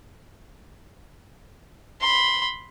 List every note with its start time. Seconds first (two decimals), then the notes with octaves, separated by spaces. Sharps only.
2.01 B5 C6